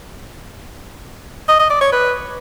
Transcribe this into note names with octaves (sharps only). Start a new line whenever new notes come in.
D#5
D#5
D5
C#5
B4